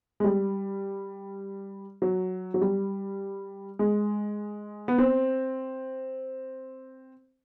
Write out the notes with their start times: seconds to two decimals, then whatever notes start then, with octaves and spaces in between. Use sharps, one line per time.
0.20 G#3
0.24 G3
2.02 F#3
2.54 F#3
2.61 G3
3.79 G#3
4.88 B3
4.98 C4